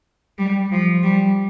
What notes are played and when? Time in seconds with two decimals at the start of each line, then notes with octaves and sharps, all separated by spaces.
0.39 G3
0.71 F3
1.03 G3